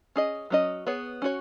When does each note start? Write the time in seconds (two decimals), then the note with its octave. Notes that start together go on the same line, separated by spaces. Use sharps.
0.16 C#4 G#4 D#5
0.50 F#3 C#4 G#4 D#5
0.87 B3 G#4 C#5
1.22 C#4 F#4 C#5